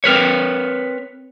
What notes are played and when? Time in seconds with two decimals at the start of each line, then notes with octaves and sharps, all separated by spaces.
0.04 C4 A#4 B4 C#5